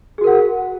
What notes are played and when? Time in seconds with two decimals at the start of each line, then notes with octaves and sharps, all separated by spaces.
0.18 G#4
0.21 F#4
0.24 A#4
0.27 F#5